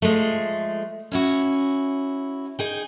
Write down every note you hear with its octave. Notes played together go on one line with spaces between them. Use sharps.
F3 G#3 A3
C#4 E4 F#4
D#4 G#4 G5